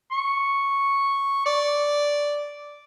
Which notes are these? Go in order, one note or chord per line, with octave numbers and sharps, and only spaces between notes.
C#6
D5